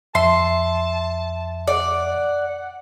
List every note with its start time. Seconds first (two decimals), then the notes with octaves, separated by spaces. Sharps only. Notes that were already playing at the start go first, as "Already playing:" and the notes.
0.15 F2 E5 A5 C6
1.67 D5 F#5